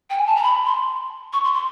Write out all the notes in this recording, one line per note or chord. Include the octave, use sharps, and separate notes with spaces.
G5
G#5
A5
A#5
B5
C6
C#6
C6
C6